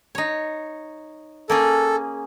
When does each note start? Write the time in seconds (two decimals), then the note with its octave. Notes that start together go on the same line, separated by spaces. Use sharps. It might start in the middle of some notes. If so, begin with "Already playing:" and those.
0.15 D#4 C#5
1.50 A#3 C#4 G#4 A4